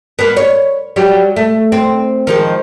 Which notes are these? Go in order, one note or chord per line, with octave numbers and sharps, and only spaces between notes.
A#3 B3
C#5
F#3 G3 G4
A3
C4
D#3 F3 G#3